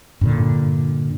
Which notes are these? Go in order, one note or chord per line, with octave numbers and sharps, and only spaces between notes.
G2 A#2 D3